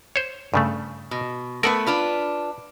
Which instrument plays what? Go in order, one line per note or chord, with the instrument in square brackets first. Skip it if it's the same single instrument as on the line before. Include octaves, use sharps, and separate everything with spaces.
[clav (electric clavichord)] C5 C#5
G2 C#3 A3
[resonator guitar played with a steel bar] B2
[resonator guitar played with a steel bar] A3 B3 B4 [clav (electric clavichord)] A#4 F#5
[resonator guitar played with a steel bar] D4 F4 B4